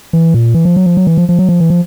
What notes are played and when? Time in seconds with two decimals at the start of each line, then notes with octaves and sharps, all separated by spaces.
0.13 E3
0.34 A#2
0.54 E3
0.65 F3
0.76 F#3
0.86 F3
0.97 F#3
1.07 E3
1.17 F3
1.29 F3
1.39 F#3
1.49 F3
1.60 E3
1.70 F3